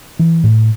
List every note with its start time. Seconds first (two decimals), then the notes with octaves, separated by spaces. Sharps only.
0.19 E3
0.44 A2